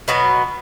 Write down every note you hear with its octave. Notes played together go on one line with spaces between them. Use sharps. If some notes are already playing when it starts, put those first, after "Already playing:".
B2 F#3 B3